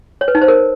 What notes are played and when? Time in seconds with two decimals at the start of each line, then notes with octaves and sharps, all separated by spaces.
0.21 C#5
0.28 B4
0.35 D#4
0.41 C5
0.48 A#4